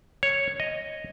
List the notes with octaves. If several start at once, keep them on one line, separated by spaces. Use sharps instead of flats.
C#5
D#5